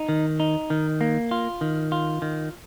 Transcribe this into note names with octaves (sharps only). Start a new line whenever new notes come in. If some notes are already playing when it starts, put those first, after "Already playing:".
Already playing: D#4
D#3
D#4
D#3
A#3
F4
D#3
F4
D#3